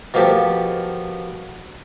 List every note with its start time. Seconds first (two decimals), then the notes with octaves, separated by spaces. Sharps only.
0.14 B2 F3 A#3 G4 A4